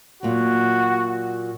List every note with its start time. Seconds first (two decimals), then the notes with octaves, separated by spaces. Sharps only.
0.23 A#2 F#3 F#4